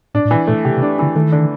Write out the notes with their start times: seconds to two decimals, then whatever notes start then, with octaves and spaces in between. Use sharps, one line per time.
0.14 A2 D4
0.25 A2
0.31 A#2 E3
0.47 A#2 A3
0.65 C3 G4
0.77 C3
0.82 D4
0.99 D3 E3
1.15 D#3 A3
1.32 D3